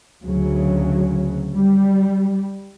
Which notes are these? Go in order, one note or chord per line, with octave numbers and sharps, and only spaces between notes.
D2 C#3 F#3
G3